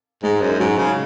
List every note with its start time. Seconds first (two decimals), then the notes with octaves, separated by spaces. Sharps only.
0.23 G#2 G#3
0.41 F#2
0.60 G#2 F#3
0.78 C#3